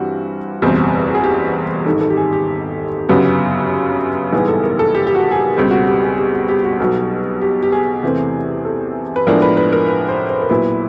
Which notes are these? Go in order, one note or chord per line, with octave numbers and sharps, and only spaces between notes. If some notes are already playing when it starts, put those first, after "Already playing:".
Already playing: G2 E3 G3 C4 F#4
F#1 E2 B2 G3 C4
G#4
G4
G#1 G#2 D#3 A4
A4
G4
G#4
G4
G1 F#2 C#3 F#3 B3 G4
A#1 G#2 E3 G3 B3 G#4
A4
A#4
A4
G4
G4
F#4
G#4
G4
C#2 B2 G3 C4
F#4
G4
G#4
G4
F#4
G4
F#4
B1 B2 F#3
G4
G4
G#4
E2 C3 E3 A3 C4
A4
B4
A2 F3 G#3 B3 D4 A#4
B4
B4
A#4
B4
C5
C5
A#4
A#1 A#2 F#3 B3 E4 B4